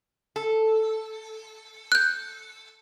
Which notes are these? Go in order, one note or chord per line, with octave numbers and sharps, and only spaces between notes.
A4
F#6 G6